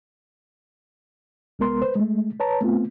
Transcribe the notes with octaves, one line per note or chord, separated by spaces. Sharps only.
C2 G#3 B3 A#4 C6
B4 C5
G#3 A3
B4 C#5 A5 A#5
A3 B3 C4 F4